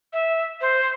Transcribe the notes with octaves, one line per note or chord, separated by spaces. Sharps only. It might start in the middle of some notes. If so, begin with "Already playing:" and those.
E5
C5